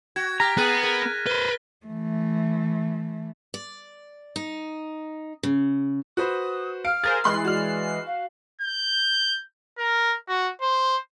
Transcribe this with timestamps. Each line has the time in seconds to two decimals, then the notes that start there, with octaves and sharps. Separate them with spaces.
0.16 F#4 G#6
0.40 G4 A#5 F6 A#6 B6
0.57 B3 G#4 F#6 A6 D#7
0.83 A#4
1.26 B4 C5 G7
1.86 E3 A3
3.54 D5
4.36 D#4
5.43 C#3
6.17 F#4 B4 C5 D#6
6.85 F5 F6 D7
7.04 G#4 A#4 C5 A6
7.24 E3 G#3 B5 C6 F#6 C7
7.45 F#4 D5 F6
8.06 F5
8.61 G6
9.78 A#4
10.28 F#4
10.61 C5